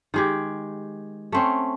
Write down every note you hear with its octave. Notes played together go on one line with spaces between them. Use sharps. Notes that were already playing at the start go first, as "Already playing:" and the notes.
D#3 G#3 G4
A3 C4 C#4